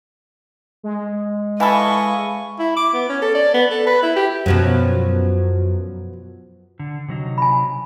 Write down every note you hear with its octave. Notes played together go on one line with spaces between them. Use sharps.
G#3
E3 A4 D#5 F5 G#5 B5 C#6
E4
D6
B3
C#4
A4
D5
B3
A4
B4
E4
G4
F#2 B2 F3 F#3
D3
C3 F#3 D#4
G#5 B5